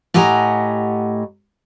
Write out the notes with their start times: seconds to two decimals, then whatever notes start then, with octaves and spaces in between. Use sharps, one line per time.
0.14 A2 G4 D#5 F#5 G#5 A#5